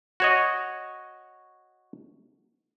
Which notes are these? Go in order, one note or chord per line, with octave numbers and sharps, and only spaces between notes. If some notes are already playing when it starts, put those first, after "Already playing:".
F#4 C#5 D#5